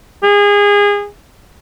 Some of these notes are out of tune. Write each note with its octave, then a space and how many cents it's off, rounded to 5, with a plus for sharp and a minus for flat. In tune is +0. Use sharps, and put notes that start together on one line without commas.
G#4 -25